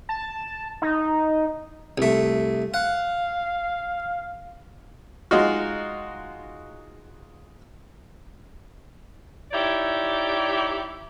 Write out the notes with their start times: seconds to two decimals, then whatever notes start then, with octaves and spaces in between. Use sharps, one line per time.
0.09 A5
0.82 D#4
1.98 C2 A3
2.74 F5 F#5
5.31 G#3 D#4 F4 F#4
9.52 D#4 E4 G4 C#5 D5